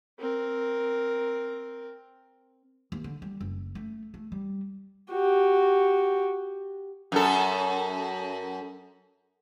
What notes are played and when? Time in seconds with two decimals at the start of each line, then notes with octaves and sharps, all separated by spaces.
0.19 C4 A#4
2.92 D#2
3.04 D3
3.22 G3
3.41 F#1
3.75 A3
4.14 A3
4.32 G3
5.11 F#4 G4
7.12 F#2 A4